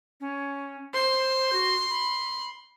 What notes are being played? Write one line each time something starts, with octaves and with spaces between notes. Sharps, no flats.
C#4
C5 C6
F#4
B5